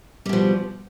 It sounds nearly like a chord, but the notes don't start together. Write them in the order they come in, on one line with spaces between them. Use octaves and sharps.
G3 B2 F3